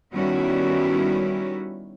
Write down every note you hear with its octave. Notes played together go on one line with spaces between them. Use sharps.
D#3 G3 B3 C#4 E4 F#4